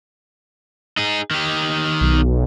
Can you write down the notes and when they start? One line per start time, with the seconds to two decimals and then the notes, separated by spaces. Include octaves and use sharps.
0.97 D#4 G#4
1.31 D#3 G4
2.01 B1